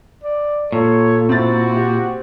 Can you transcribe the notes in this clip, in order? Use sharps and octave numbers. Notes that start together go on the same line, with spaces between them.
D5
A#2 A4 C#5
C4 E4 F#4 A6
G4